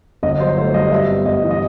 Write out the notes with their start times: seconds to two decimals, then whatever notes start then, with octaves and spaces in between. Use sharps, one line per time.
0.23 G1 D#5
0.40 F#3 C5
0.58 A3 C5
0.74 G2 D#5
0.91 G2 E5
1.09 B3
1.26 G2 D#5
1.44 E3
1.51 D#5